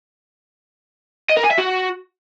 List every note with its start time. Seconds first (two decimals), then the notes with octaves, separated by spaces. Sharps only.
1.30 D#5
1.37 A#4
1.44 G#5
1.51 E5
1.58 F#4